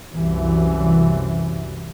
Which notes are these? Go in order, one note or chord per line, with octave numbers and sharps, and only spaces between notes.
C2 F#2 E3